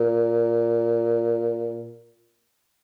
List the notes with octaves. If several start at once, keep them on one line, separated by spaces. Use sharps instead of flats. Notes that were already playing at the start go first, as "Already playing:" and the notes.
Already playing: A#2